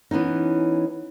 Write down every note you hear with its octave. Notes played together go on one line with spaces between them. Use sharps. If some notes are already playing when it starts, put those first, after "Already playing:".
E3 B3 C#4 D#4